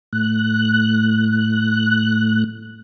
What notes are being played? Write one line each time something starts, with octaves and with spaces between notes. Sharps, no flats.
A2 F#6